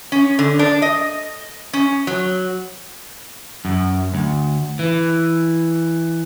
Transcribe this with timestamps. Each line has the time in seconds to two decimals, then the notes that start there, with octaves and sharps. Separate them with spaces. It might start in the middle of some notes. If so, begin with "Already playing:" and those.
0.12 C#4
0.39 D3
0.59 D4
0.82 D#5
1.73 C#4
2.07 F#3
3.65 F#2
4.14 D2
4.79 E3